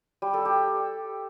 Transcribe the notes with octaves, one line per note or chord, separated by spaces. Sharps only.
G3
A4
G4